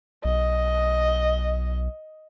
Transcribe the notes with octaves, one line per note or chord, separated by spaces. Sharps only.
B1 D#5